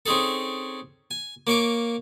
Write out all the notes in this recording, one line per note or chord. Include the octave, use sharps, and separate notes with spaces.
C4 C#4 D#4 G#4 A4
G#5
A#3 C#5 F5 D6